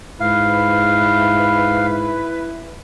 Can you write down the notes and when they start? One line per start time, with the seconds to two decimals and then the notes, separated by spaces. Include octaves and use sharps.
0.20 G#2 E4 B4 F5